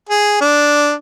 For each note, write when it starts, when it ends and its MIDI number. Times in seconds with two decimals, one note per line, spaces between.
0.09 0.38 68
0.41 0.93 62